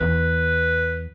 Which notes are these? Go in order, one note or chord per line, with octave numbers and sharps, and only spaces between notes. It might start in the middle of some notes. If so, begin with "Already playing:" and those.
E2 B4